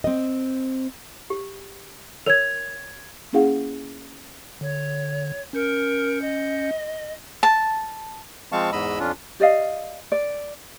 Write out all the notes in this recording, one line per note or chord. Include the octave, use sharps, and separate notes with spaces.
C4 D#5
G4
A#4 C#5 G#6 F7
A#3 C#4 E4 G#4 F5 F#5
D3 C#5
C#4 A#4 G6 C#7
D#5
A5
F3 G#3 C4 F5 A5 C#6
E2 G#2 D#5 B5 E6
F2 C#4 D4 F4
G4 D5 D#5 F5
D5